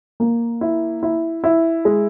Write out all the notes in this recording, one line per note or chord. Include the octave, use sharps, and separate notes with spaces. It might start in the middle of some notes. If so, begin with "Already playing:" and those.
A#3
E4
E4
E4
G#3